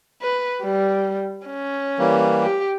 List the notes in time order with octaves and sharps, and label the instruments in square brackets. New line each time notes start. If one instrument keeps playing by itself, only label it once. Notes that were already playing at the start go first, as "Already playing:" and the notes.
[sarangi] B4
G3
C#4
[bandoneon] E3 G3 A#3
[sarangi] G4